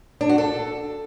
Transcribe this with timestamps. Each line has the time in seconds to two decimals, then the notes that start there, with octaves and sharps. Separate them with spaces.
0.21 D4
0.29 F#4
0.38 A4